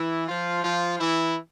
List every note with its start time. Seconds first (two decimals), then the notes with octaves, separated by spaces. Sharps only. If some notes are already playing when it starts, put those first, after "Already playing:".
Already playing: E3 E4
0.28 F3 F4
0.63 F3 F4
0.99 E3 E4